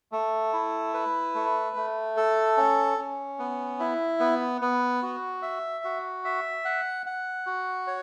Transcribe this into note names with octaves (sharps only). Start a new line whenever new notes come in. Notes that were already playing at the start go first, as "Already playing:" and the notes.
A3
E4
B4
A3
A3
A4
C#4
C#4
B3
E4
B3
B3
F#4
E5
F#4
E5
F#5
F#5
F#4
C#5